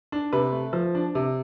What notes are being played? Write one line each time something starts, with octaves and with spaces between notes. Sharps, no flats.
D4
C3 B4
A3
F3
D4
C3